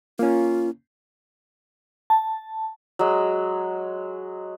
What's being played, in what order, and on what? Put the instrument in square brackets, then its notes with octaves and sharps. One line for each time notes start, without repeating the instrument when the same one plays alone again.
[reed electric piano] A#3 C#4 [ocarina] F4
[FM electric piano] A5
[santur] F#3 G#3